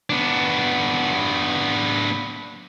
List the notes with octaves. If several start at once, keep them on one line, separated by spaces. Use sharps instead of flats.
B3 D4